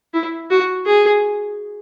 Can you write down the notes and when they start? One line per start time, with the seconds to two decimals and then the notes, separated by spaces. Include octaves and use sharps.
0.14 E4
0.50 F#4
0.86 G#4